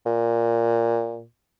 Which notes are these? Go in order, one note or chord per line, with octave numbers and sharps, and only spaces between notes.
A#2